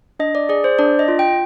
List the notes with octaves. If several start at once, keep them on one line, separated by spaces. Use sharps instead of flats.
D4 D#5
D5
G#4 D5
C5
D4 D5
D#5
F4
G5